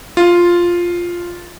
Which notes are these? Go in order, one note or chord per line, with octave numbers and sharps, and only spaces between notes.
F4